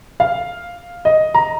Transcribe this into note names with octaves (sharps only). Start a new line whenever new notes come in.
F5
D#5
A#5